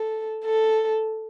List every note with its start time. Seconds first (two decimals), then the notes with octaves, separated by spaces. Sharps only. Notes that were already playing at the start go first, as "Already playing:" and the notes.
Already playing: A4
0.45 A4